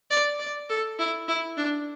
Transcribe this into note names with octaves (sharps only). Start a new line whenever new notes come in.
D5
D5
A4
E4
E4
D4